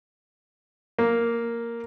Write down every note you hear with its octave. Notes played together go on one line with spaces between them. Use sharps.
A#3